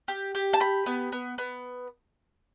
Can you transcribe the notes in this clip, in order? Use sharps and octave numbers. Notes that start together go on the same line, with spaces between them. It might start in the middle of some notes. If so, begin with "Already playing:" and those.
G4
G4
A5
G4 B5
B3
B3
B3